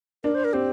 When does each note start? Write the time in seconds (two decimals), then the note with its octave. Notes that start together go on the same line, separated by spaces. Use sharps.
0.24 D4 A#4
0.35 C5
0.44 A#4
0.53 C4 G4